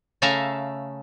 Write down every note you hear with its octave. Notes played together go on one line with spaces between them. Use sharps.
C#3 A3 A4 E5 F5 A#5